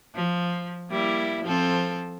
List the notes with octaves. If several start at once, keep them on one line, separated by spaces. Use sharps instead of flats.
F3
G3 A#3 E4
F3 C4 A4